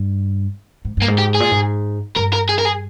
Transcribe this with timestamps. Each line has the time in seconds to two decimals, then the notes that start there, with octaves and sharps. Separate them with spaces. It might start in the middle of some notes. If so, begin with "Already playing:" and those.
Already playing: G2
0.85 G#2
0.97 G2 A#3
1.08 G#2
1.18 G4
1.34 G#4
1.40 A#2
1.51 G#2
2.16 G2 A#4
2.33 A#4
2.49 G#4
2.59 A#4
2.65 G#4